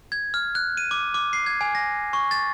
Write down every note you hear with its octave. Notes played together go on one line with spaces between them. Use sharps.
G#6
F6
F#6
D#7
D6
D6
C7
G#6
G#5
A#6
C#6
A6